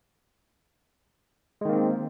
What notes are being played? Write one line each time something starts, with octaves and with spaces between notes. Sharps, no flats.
D#3 G#3 A#3 C4